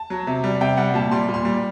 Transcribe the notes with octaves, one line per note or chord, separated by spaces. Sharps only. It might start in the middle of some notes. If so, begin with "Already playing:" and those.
Already playing: A5
F#3
C3
G3
C3 G5
G3 F#5
A#2 A5
G3 C6
A#2
C6
G3